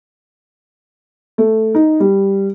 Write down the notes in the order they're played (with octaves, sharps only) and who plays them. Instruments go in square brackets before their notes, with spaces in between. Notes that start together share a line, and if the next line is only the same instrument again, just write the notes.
[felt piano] A3
D#4
G3